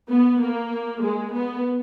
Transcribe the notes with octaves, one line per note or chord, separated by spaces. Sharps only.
B3
A#3
G#3
B3